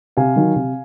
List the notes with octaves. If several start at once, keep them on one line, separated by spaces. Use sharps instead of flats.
C3 F5 G#5
D#3 F#3
C3